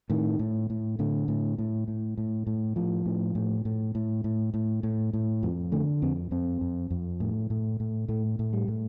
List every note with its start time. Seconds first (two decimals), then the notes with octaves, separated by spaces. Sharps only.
0.10 A2 D#3
0.39 A2
0.70 A2
0.99 A2 D3
1.28 A2
1.58 A2
1.88 A2
2.18 A2
2.47 A2
2.76 A2 F3
3.06 A2
3.35 A2
3.65 A2
3.95 A2
4.24 A2
4.54 A2
4.83 A2
5.13 A2
5.43 F2 F3
5.72 D3 A3
6.02 F2 C4
6.31 F2 C4
6.61 F2
6.90 F2
7.20 A2
7.50 A2
7.80 A2
8.08 A2 A3
8.39 A2
8.53 G3
8.68 A2